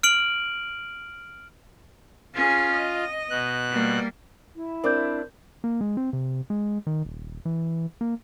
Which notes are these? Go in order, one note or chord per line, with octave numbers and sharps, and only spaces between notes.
F6 D7 F#7
C#4 F4 G#4
D#5
B2 F#6
G3 A#3
E4
C4 D4 A#4 D6 G6
A#3
G#3
C4
C3
G#3
D#3
D#1
E3
A#3